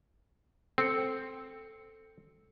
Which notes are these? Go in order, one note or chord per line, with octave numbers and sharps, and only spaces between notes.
C4 A4 C#7